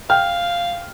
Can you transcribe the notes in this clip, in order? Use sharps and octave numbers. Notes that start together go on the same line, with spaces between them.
F5 G5 F6